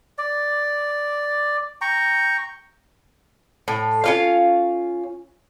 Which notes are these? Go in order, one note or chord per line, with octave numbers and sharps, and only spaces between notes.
D5
G5 A#5 C#6
A2
C#4 F4 F5